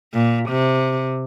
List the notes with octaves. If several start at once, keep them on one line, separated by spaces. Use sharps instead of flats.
A#2
C3